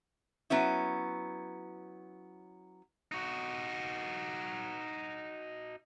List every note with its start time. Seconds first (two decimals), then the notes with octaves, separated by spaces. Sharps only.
0.50 F#3 B3 C#4 E4
3.12 D#4 F#4